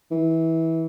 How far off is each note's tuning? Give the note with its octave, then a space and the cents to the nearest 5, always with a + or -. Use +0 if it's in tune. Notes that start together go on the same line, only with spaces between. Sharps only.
E3 -20